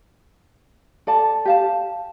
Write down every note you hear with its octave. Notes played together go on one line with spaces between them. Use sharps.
A4 D5 A5
G4 F5 A5